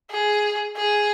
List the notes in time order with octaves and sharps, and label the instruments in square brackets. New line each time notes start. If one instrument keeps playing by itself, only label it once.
[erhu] G#4
G#4